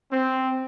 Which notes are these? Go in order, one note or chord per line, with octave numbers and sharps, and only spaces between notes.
C4